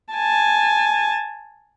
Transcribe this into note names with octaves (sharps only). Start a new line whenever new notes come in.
G#5 A5